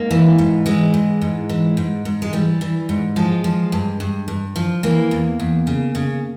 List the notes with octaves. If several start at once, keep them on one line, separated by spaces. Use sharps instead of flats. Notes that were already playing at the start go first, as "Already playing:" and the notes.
Already playing: G#2 A#3
E3
G#2
E3 G#3
G#2
G#2
E3
G#2
G#2
G#3
E3 G3
E3
G#2
F3 G#3
F3
G2
G2
G2
F3
E3 A#3
E2
E2
C#3
C#3